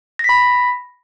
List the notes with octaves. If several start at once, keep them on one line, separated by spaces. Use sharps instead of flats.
B5 A#6 B6